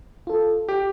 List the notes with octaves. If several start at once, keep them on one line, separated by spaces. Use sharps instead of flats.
F4 A4
G4